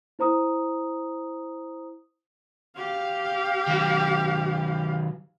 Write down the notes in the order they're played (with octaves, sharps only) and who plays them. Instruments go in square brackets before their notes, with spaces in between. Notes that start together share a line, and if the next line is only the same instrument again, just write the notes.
[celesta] E4 C5 A#5 D#6
[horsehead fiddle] G4 F5
[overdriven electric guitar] D#3 F#3